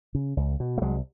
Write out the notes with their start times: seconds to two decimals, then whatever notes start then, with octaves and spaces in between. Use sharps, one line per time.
0.15 C#3
0.37 C#2
0.60 B2
0.78 A3
0.82 C2 F#3 G#3